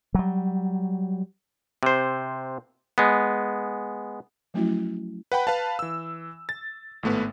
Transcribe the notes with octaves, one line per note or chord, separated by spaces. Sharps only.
F#3 G3
C3 C5
G#3 B3
F3 F#3 A3 C#4 E4 F#4
B4 F#5 G5 B5
B4 F5 A5
E3 E6
A6
G#1 A2 A3 B3 B4